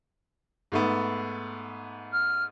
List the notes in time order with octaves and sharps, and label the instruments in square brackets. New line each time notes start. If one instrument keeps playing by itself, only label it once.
[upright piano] G#2 A3 B3
[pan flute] F6